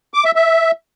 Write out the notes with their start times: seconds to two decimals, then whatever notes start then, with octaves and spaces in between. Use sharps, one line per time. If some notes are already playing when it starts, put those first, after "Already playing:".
0.14 D6
0.25 E5
0.36 E5